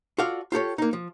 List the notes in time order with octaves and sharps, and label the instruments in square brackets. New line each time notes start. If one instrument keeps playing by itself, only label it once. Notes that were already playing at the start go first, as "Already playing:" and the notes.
[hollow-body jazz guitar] F4 F#4 A4 D5 F5
F4 G4 A4 C#5
A#3 D#4
F3